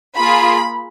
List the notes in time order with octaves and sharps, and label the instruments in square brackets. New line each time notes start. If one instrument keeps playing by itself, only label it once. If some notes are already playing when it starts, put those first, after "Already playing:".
[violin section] A#3 F4 G#4 B5